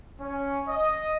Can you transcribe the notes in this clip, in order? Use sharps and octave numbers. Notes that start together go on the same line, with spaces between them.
C#4
D#5